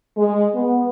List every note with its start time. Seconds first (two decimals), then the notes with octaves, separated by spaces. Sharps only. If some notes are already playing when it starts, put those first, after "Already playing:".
0.17 G#3
0.54 B3